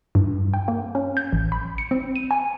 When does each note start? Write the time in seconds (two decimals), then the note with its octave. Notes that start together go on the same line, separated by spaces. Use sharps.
0.15 G2
0.54 G5
0.68 A#3
0.95 C#4
1.17 G6
1.32 A1
1.52 B5
1.78 C#7
1.91 C4
2.16 D#7
2.31 G#5